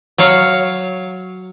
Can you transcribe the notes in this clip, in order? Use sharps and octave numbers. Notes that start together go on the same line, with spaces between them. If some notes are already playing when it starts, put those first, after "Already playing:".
F#3 C#5 F5